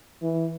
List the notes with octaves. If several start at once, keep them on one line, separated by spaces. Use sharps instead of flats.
E3